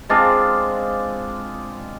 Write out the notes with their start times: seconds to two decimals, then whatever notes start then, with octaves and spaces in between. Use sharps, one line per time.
0.09 G#3 C4 D4 F4